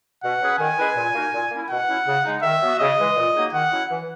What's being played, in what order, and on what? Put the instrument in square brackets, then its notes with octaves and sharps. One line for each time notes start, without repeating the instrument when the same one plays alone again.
[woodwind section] B2 [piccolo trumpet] F#5
[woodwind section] F#3 C#4 G#4 B4
[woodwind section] D#3 [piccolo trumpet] G#5
[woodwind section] G#3 C#4 E4 B4
A#2
A#3 D#4 F#4 A#4
A#2
A#3 C#4 E4
[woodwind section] B2 [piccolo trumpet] F#5
[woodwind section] F#3 C#4 E4
C#3
G#3 D#4
[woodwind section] D#3 [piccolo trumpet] E5
[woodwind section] F#3 B3 F#4
[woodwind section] C#3 [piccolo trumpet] D#5
[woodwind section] E3 G#3
A#2
F#3 A#3 D#4 G#4
[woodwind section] D#3 [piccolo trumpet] F#5
[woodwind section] F#3 C#4 E4
E3